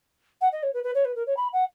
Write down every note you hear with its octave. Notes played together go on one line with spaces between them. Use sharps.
F#5
D#5
C#5
B4
B4
C#5
B4
A#4
C#5
B5
F#5